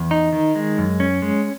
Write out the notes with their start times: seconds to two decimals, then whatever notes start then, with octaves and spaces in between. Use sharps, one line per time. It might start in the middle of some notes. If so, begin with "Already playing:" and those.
Already playing: E2
0.11 D#4
0.33 D#3
0.56 G#3
0.78 F#2
1.00 C#4
1.22 G#3